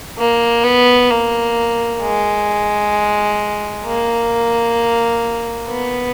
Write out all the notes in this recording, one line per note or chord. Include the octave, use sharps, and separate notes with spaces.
A#3
B3
A#3
G#3
A#3
B3